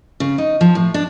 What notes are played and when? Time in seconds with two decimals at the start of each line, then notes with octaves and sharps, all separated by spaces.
0.20 C#3
0.38 D#4
0.61 F3
0.75 A2
0.94 D4